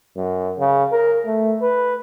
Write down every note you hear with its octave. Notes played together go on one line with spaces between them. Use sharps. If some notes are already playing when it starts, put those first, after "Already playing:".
F#2
C#3
A#4
A3
B4